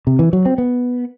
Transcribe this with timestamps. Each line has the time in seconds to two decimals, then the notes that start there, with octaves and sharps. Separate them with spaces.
0.07 C3
0.19 E3
0.33 F#3
0.45 C4
0.58 B3